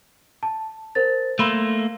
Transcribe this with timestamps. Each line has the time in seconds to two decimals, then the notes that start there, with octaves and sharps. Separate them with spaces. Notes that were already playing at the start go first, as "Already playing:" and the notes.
0.43 A5
0.95 A#4 C5 A6
1.39 A3 A#3 B5 C6 E6